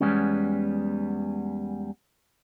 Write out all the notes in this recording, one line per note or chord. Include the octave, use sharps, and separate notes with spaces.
E2 C#3 G3 G#3 B3 C#4